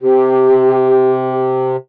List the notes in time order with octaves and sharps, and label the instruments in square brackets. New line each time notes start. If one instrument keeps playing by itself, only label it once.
[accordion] C3 [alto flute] G4